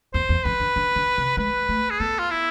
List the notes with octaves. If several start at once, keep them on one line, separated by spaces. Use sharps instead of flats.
E2 C5
E2
F2 B4
D3
D3
D3
C3
G#3 B4
A3
G#4
B3 A4
F4
E4